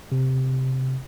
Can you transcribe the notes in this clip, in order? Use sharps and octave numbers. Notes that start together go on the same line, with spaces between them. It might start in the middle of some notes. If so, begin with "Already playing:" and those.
C3